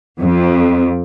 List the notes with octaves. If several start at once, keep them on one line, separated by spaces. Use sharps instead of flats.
F2